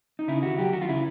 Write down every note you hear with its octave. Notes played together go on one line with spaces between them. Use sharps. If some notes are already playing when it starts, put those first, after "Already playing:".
D#4
C#3 E4
D#2 F#4
F#3 G4
D#2 F#4
F4
C#3 E4